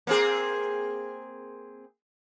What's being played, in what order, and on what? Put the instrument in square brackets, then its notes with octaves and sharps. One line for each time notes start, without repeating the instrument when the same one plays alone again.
[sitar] A#3 C4 G#4